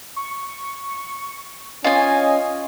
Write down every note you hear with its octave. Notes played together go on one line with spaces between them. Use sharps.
C#6
C#4 F4 D#5 G#5